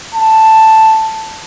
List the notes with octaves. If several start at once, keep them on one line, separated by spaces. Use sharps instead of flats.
A5